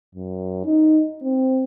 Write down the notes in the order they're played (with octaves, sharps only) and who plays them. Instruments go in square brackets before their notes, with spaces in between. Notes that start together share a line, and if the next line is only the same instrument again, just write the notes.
[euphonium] F#2
D#4
C4